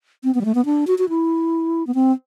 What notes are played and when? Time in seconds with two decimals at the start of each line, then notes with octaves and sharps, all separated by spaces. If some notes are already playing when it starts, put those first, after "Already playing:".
0.24 C4
0.34 B3
0.41 G3
0.45 A3
0.55 B3
0.65 D4
0.87 F#4
0.98 F#4
1.09 E4
1.87 B3
1.95 C4